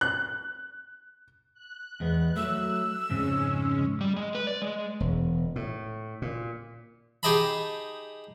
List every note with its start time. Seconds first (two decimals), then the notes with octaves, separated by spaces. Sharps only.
0.01 F#6
1.54 F#6
2.00 E2 G#3 B3
2.36 F#3 A3 E6
3.10 F2 G#2 C#3 G#3 C#4
4.01 G3
4.16 G#3
4.35 B4
4.47 D5
4.62 G#3
5.00 E1
5.56 A2
6.22 A#2
7.23 D#4 G4 G#4 D#5 A5 B5